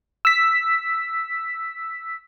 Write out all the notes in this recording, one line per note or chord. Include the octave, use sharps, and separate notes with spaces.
E6 B6